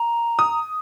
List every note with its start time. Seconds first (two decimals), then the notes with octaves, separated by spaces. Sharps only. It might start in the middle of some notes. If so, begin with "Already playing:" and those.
Already playing: A#5
0.39 D#6